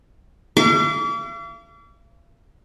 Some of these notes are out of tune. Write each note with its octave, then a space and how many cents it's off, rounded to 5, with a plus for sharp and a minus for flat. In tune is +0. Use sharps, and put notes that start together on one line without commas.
F5 -45 D6 -40